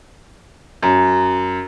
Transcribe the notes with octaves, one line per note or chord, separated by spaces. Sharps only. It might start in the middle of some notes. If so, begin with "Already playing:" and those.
F#2